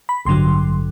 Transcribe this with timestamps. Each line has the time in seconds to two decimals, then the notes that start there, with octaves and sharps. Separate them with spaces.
0.09 B5
0.25 A1 G2 D3 F#3 C6